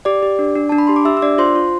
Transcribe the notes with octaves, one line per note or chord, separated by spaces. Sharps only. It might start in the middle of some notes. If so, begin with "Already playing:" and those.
G4 D5 D6
G4
D4
D4
D4 A5
B5
G4 C6
D6
G4 E5 E6
E6
D4 D5 D6
F4 C5 C6
F4